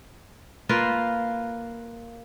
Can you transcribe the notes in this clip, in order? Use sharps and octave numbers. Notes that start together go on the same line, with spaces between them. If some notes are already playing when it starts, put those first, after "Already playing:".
A#3 F4 B4